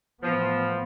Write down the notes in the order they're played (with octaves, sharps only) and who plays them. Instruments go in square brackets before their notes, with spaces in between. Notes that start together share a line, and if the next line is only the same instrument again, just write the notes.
[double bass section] A2 E3 B3 [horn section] F3